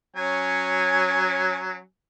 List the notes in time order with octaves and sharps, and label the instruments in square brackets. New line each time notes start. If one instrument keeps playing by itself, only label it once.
[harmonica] F#3 C#4 G#5